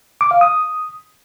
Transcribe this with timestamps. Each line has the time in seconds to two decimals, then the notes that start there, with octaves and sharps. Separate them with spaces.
0.21 D6
0.31 F5
0.41 D#6